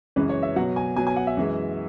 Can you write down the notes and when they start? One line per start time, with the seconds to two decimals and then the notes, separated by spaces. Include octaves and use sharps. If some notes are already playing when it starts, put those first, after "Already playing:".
0.16 F#2 C#3 E3 G#3 B4
0.29 C#5
0.43 E5
0.56 B2 F#3 F#5
0.76 G#5
0.96 B2 F#3 G#5
1.07 G#5
1.16 F#5
1.27 E5
1.37 F#2 E3 G#3